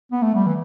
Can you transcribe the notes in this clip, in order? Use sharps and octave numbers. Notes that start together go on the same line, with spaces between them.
B3
A3
G3
E3